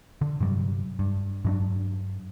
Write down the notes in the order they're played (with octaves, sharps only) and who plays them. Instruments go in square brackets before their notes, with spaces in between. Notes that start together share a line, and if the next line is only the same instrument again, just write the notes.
[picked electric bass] D3
G2 C3 F#3 G3
G2
G2 F#3 D4